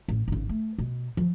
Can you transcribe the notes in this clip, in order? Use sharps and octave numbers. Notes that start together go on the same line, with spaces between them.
A1
G#1 C#3
A3
B2
F3 F#3